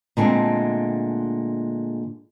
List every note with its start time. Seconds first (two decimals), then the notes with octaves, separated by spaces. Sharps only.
0.17 A#2 D3 G#3 A3 C4